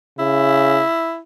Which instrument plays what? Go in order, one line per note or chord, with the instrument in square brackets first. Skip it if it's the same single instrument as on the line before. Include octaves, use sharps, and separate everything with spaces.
[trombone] C#3 [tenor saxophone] E4